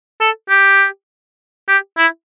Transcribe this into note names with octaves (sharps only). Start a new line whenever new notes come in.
A4
G4
G4
E4